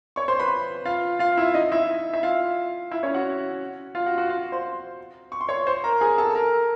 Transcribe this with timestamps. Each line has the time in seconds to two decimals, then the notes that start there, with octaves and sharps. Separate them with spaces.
0.16 C#5 C#6
0.28 C5 C6
0.40 B4 B5
0.85 F4 F5
1.19 F4 F5
1.37 E4 E5
1.54 D#4 D#5
1.72 E4 E5
2.13 E5
2.23 F4 F5
2.91 E4 E5
3.03 C#4 C#5
3.14 F#4 F#5
3.95 F4 F5
4.06 F#4 F#5
4.18 F#4 F#5
4.29 F4 F5
4.52 C5 C6
5.32 C#6
5.41 C6
5.49 C#5 C#6
5.67 C5 C6
5.84 A#4 A#5
6.01 G#4 G#5
6.18 A4 A5
6.35 A#4 A#5